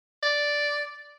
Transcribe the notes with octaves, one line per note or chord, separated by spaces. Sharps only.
D5